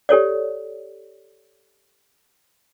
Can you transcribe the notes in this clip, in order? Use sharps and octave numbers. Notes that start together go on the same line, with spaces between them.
G4 A4 C#5 D5